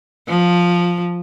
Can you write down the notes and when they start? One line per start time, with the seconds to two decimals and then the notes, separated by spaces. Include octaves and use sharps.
0.28 F3